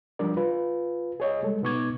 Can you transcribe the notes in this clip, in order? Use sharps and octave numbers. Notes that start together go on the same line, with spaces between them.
F3 G3 D4 A#4 D5
F4 B4
G#4 C#5 D#5
G3 G#3 A4
B2 B3 D#4 C#6 D6 G#6